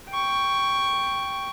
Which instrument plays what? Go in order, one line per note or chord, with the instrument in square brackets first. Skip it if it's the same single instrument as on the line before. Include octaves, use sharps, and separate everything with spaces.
[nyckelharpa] G5 C#6